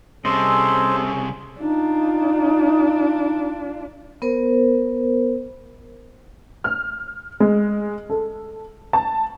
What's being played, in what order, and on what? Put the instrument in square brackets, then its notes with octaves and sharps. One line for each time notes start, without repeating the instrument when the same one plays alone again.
[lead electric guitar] C2 C3 [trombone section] C#4 G#4 [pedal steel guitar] A4 D#5 [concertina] C5
[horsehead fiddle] D4 F4 [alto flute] D#4
[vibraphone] B3 A#4 C5
[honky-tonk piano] F6
G#3
A4
A5